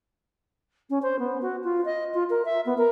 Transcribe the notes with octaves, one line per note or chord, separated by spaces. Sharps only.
C#4
C5
B3
F#4
F4
D#5
F4
A#4
E5
B3
A#4